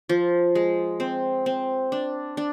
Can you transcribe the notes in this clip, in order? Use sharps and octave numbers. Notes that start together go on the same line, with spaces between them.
F3
G#3
C4
C4
D4
D4